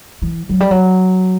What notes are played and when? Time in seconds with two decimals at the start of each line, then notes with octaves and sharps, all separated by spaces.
0.22 E3
0.49 F#3
0.60 G3
0.71 F#3